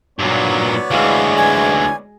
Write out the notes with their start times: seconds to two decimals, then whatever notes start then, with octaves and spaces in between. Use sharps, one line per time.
0.19 G2 A#2 F#3 B3 C#5 D5
0.91 D2 E3 G#3 F5
1.38 G#5